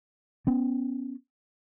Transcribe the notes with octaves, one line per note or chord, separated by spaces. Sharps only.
B3 C#4